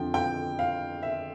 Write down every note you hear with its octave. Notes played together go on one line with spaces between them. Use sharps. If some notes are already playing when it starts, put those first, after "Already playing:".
Already playing: F2 D3 F3 G5
G5
F5
E5